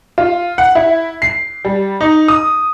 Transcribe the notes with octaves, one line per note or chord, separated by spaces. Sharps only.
F4
F#5
E4
C7
G3
D#4
D#6